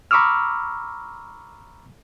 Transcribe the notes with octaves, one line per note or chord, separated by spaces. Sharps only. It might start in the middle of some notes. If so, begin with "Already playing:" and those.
A#5 B5 C#6 D6 E6 F6